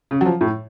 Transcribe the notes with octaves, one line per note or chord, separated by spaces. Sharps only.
C#3
F#3
F3
A2